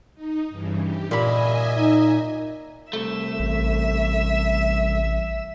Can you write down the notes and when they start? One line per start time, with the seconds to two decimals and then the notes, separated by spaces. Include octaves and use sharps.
0.15 D#4
0.49 G2 C#3 E3
0.80 G4
1.11 A#2 D#5 E5 G#5 B5
1.78 D#4
2.93 C2 A3 E5
3.39 A1